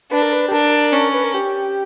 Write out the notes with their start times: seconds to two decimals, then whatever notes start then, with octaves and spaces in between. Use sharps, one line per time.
0.11 D4 B4
0.22 A#4
0.33 B4
0.48 G4
0.52 D4 A#4
0.93 C#4
1.14 B4
1.24 A#4
1.34 G4